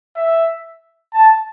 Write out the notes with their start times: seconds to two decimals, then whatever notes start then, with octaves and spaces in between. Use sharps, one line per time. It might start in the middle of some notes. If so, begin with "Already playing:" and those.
0.16 E5
1.13 A5